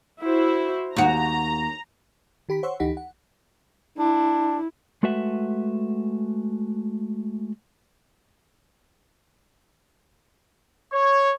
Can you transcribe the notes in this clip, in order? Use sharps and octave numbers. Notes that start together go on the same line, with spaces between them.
E4 F#4 C5
D#2 F#4 A#5
D#3 G4 B5 B6
C5 C#5 F#5 C6 C#6 E6
D2 E3 D#4 G4 F#5 B6
F#5
D4 E4
G#3 A3 F#4 B4 E5 F#5
C#5